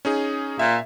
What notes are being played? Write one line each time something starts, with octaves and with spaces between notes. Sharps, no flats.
C#4 D#4 G#4
A#2 E5